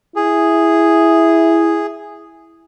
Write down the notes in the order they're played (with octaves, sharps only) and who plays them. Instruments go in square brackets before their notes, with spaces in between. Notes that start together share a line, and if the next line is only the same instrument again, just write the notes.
[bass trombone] E4 [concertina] G#4